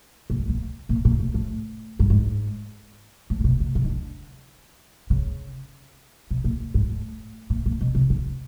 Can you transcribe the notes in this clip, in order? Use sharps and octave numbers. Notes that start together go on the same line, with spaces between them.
A#2
B2
A#2
A#2
A#2
A2
A2
G2
G#2
A2
A#2
B2
C3
C3
D#3
D3
C#3
B2
A#2
G#2
A2
A#2
A#2
B2
C3
D3